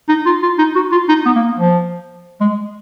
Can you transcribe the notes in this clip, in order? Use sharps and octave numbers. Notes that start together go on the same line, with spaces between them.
D#4
F4
F4
D#4
F#4
F4
D#4
B3
A#3
F3
G#3